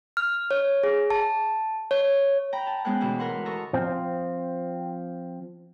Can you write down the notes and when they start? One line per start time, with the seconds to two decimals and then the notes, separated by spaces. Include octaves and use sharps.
0.17 F6
0.51 C#5
0.84 G#4
1.10 A5
1.91 C#5
2.52 G5 A#5 B5
2.67 A5
2.85 G#3 B3 C#4 C5 G5 F#6
3.01 D2 G#2 B2 E3
3.19 A#4 B4 F#5 C6
3.45 A4 D#5 A#5 C#6
3.73 F3 C4